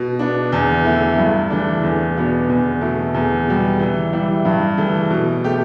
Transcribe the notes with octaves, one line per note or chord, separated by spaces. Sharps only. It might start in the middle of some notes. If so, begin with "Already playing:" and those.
Already playing: B2
B3 D4
E2
E3 A3 E4
G2
E3 A3 D4
E2
B2 B3 D4
E2
B2 A3 E4
E2
B2 G3
E3
G3 E4
G2
E3 A3
B2
A3 G4